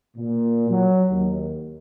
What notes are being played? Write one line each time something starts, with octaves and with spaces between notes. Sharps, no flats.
A#2
F#3
D#2